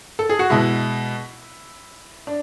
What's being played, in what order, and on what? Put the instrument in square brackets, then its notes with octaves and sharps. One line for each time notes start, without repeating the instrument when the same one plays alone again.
[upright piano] A4
G#4
F#4
B2 G#3 E4
D4